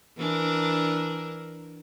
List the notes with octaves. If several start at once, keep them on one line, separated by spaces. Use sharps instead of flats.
E3 D4 A#4